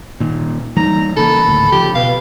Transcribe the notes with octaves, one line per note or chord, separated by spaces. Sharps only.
A#2 D#3
E3 G3 A#3 D#4 A#5
C#3 A#3 A4 B5
G#1 D2 A2
C#3 F3 G4
B2 B4 F5